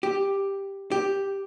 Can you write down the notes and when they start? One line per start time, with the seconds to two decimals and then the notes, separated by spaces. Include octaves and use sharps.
0.03 G4
0.91 G4